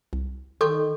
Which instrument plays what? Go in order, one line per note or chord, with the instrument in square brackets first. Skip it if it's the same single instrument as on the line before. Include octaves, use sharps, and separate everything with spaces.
[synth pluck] C2
[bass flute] D#3 [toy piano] A4 [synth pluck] C6 C#6 G6